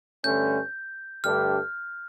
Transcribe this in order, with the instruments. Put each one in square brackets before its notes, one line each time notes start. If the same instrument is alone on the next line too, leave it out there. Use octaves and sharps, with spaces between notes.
[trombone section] G2 D3 A3 C#4 [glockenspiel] G6
[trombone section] G2 D3 A3 D4 G4 [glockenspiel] F6